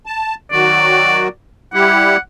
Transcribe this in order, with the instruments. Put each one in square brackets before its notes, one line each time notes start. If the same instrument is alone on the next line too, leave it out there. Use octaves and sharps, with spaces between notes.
[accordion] A5
[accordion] D#3 F#3 F#4 [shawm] D5
[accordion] G3 E4 G4 [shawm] F#5